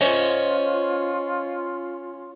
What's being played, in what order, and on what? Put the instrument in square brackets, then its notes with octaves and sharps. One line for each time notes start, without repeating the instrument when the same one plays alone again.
[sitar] C#4 [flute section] F4 [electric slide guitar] C5 C#5 D#5